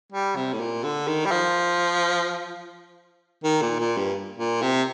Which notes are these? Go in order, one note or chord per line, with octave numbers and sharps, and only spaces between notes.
G3
C3
A2
A#2
D3
D#3
G3
F3
D#3
A#2
A#2
G2
A#2
C3